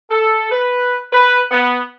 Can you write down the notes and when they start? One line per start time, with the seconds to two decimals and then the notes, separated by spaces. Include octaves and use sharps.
0.11 A4
0.51 B4
1.12 B4
1.51 B3